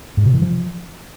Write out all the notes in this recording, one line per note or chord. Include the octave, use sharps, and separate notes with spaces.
G#2
C3
E3
F3